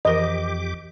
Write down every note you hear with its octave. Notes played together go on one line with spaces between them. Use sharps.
F2 E3 G4 A#4 D#5 D6